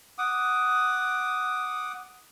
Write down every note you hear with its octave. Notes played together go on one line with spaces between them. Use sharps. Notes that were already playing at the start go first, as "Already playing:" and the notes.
F#5 D6 D#6